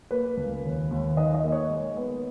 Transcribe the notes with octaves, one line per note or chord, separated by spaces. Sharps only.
A#3 B4
C#2
D#2
D#2
D#3 D#5
D#5
A#3
C#5
G#3
B3